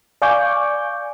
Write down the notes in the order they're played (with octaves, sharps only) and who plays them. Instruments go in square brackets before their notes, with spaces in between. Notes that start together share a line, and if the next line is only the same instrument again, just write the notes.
[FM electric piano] D5 F5 G#5 C#6 D6 G6